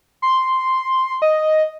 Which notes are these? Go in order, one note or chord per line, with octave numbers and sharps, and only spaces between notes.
C6
D#5